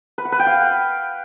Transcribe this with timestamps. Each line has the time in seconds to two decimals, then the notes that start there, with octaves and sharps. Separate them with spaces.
0.18 B4
0.25 F#5
0.32 B4
0.39 G5
0.46 F5